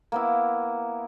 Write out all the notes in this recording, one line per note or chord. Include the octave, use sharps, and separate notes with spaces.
A#3 B3 E4